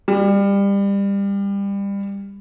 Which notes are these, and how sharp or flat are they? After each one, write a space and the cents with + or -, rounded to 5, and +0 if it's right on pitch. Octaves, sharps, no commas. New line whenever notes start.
G3 +25